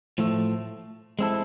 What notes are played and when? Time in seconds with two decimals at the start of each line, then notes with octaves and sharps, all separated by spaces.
0.18 A2 F3 A3
1.19 G#3 C4 E4 A4